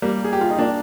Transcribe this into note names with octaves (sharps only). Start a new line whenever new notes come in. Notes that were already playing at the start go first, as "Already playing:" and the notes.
G3 A#3
G#4
G4
F4
D#4
A#3 D4